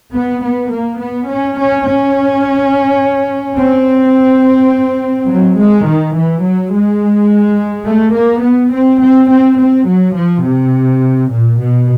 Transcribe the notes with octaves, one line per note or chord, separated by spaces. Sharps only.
B3
B3
A#3
B3
C#4
C#4
C#4
C4
F#3
G#3
D#3
E3
F#3
G#3
A3
A#3
B3
C4
C4
C4
C4
F#3
F3
C3
A#2
B2